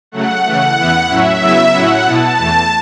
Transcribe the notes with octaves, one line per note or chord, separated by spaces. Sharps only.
C#3 F#3 A3 F#5
C#3 E3 A3 F#5
E2 E3 B3 E4
A2 F#3 C#4 E4 E5
C#3 F#3 B3 E4
A2 F#3 C#4 E4 F#5
B2 B3 E4 A5
E2 E3 A3